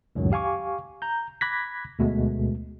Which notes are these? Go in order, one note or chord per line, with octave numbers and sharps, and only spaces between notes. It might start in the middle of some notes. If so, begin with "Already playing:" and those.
C#2 F#2 A2 D#3 F#3
G4 F5 G#5 C#6 D6
A#5 G6
B5 D6 F#6 G#6 A#6 B6
D2 B2 G#3 A3